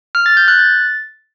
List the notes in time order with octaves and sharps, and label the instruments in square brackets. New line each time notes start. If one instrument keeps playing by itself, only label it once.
[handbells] F6
A6
G6
F#6
A6